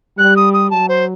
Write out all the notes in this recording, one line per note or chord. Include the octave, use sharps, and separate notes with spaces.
G3 F#6
D#6
D#6
F#3 A5
C5